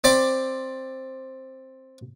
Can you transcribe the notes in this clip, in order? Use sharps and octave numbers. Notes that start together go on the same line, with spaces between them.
C4 D5 B5 D6